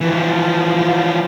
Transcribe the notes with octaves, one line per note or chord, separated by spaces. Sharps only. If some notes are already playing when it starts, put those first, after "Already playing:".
E3 F3